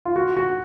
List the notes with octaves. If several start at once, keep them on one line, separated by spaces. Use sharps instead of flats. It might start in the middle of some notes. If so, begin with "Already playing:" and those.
F4
F#4
F#4